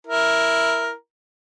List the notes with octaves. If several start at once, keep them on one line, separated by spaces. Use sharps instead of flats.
E4 A#4